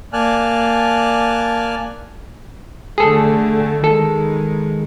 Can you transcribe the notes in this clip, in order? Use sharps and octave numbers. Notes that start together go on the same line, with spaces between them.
A#3 D5 G#5 A5 F6 F#6
D3 A3 G#4 A4
D#3 G#3 A4